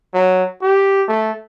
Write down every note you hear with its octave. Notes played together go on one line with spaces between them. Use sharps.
F#3
G4
A3